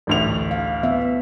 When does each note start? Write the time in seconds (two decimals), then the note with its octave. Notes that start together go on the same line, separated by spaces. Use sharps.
0.07 A1 D2 F7
0.51 F5
0.83 B3 E5